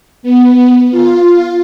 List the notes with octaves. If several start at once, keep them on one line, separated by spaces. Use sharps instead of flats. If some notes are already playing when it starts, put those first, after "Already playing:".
B3
F4